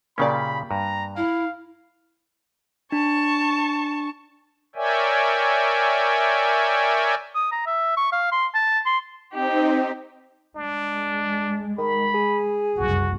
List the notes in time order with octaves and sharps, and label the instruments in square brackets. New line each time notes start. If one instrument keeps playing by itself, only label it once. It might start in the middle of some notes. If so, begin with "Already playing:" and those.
[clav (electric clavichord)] A#2 C#3 C#4 [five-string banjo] A#3 G4 D5 [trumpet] B5
[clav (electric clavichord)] G2 [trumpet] A#5
[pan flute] E4 [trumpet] F5
[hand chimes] D4 [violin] A5 C#6
[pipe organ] A#4 C#5 D5 E5 G5 G#5
[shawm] D#6
A#5
E5
C#6
F5
C6
A5
C6
[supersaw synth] C4 D#4 [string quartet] G4
[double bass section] G#3 [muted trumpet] D4
[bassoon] D#3 [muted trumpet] B5
[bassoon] G#4
[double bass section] F#1 C2 F#2 [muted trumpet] F#4